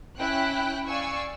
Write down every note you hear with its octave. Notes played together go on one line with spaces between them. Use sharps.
C#4 E4 G5 F#6
D5 F5 G#5 C#6 E6